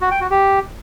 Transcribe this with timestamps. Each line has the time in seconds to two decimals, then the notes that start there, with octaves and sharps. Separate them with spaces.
0.01 F#4
0.11 G5
0.21 F#4
0.30 G4